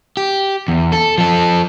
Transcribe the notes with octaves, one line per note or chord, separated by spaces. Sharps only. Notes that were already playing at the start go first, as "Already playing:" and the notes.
G4
E2
A4
F3 A4